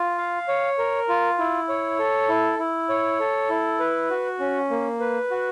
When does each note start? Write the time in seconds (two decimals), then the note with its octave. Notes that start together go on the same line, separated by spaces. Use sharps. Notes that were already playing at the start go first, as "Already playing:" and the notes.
Already playing: F4
0.18 F5
0.48 C#5
0.78 A#4
1.09 F4
1.39 E4
1.69 C#5
1.99 A4
2.29 E4
2.59 E4
2.89 C#5
3.20 A4
3.49 E4
3.80 B4
4.10 F#4
4.40 C#4
4.70 A#3
5.00 B4
5.31 F#4